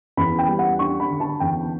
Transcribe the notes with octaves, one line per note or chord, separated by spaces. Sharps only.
E2 B5
G5
G3
F#5
D4 C#6
B5
D3
A5
E2 G5